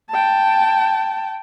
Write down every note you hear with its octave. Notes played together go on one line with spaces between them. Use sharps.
G5 A5